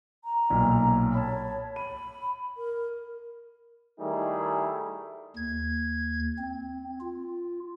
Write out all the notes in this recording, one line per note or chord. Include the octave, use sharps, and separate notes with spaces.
A#5
B1 A#2
C#5 A5 B5
B5 D#7
A#4
D#3 G3 A3 D#4 E4 G#4
D#2 G#6
C4
F4